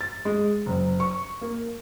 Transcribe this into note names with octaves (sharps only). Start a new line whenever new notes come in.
A6
G#3
F#1
C#6
A#3